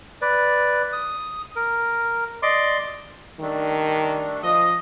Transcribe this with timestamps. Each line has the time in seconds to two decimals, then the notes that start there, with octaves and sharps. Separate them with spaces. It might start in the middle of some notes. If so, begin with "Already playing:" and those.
0.22 B4 D5
0.93 D#6
1.56 A#4
2.43 D5 D#5 C6 D6
3.40 D#3 G3 A3 D4
4.43 F3 D#5